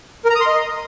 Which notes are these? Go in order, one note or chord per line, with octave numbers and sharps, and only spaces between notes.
A#4
A#5
D#6
C6
D#5